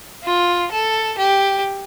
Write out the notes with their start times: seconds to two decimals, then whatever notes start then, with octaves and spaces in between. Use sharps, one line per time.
0.24 F4
0.71 A4
1.18 G4